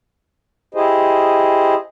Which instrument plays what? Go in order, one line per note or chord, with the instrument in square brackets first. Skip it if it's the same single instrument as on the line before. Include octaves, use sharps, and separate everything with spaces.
[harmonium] E4 G4 G#4 C5 D#5